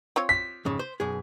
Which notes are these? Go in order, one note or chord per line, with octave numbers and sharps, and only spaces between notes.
C4 F4 C#5
B6
F2 G#2 C#3
C5
B1 F#2 G#4